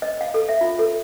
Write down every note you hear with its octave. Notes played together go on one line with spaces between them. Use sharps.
D#5
F5
A4
E5
F4
A4